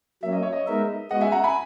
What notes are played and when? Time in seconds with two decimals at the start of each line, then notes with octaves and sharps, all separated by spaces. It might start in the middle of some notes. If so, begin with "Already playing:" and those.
0.23 F#3 A#3 C#4 E5
0.33 D#5
0.42 C#5
0.53 D#5
0.67 G#3 B3 D#4 A#4 E5
1.11 G#3 B3 F#4 D#5 F#5
1.21 E5 G#5
1.32 F#5 A#5
1.44 G#5 B5